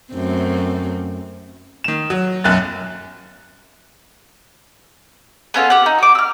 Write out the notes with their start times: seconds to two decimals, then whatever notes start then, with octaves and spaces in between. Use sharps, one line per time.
0.12 F#2 A3 C4
1.84 D#3 E7
2.10 F#3
2.44 B1 F#2 F#6 A6
5.54 B3 C#4 F4 A4
5.70 G4 F#5
5.86 D#4
5.98 F#4 D6
6.15 E6 F6